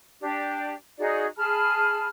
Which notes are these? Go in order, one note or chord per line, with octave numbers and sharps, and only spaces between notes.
D4 G4
D#4 F#4 G#4 D5
G#4 A5 B5 F6